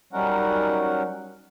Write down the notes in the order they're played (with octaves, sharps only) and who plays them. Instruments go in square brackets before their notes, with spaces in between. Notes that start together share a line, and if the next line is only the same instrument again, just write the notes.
[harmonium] F#3 G3 C#4 D#4 A#4 F#5